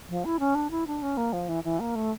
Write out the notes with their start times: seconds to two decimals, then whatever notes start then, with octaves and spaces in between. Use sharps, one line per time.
0.09 F3
0.25 E4
0.40 C#4
0.55 D4
0.71 E4
0.87 D4
1.02 C#4
1.17 A#3
1.33 F3
1.49 E3
1.64 E3
1.80 A#3
1.95 A3